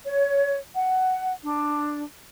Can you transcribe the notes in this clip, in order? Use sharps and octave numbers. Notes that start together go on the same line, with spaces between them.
C#5
F#5
D4